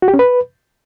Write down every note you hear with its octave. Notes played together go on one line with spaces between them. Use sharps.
F#4
G4
C#4
B4